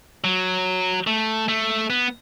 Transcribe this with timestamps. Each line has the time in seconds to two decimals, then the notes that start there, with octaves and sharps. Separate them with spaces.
0.24 F#3
1.07 A3
1.48 A3
1.90 B3